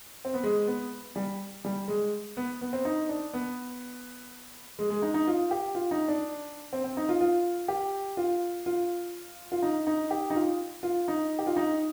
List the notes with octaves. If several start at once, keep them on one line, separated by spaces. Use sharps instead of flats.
C4
B3
G#3
B3
G3
G3
G#3
B3
B3
C4
D#4
D4
B3
G#3
G#3
D#4
D#4
F4
G4
F4
D#4
D4
C4
C4
D#4
F4
F4
G4
F4
F4
F4
D#4
D#4
G4
D#4
F4
F4
D#4
G4
F4
D#4